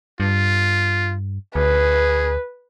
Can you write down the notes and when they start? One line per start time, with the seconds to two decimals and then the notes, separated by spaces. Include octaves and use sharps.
0.20 G2 F4
1.55 D2 G#4 B4